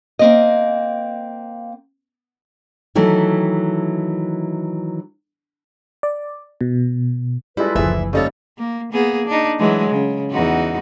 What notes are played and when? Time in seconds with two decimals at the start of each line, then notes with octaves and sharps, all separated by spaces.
0.19 A#3 C4 D#5
2.95 D#3 E3 F#3 A3
6.03 D5
6.61 B2
7.57 G3 G#3 E4 F4 A4 B4
7.75 F#1 D2 E3 F3 E4 G#4 E5
8.13 F2 C#3 G3 A#3 D#4 A4 C#5
8.58 A#3
8.93 A#3 B3 G#4
9.27 D4 D#4
9.59 E3 F#3 G#3
9.90 C#3
10.31 E2 D#4 F#4